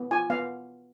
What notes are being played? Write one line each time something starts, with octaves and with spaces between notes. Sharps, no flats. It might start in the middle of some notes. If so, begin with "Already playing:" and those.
Already playing: B3
F4 G#5
B3 F5